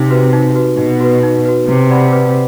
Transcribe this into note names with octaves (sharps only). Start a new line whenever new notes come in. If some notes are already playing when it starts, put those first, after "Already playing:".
Already playing: C3 D#4
F#4 B4
D#4
F#4 B4
B2 D#4
F#4 B4
D#4
F#4 B4
C3 B4
D5 F#5 B5
B4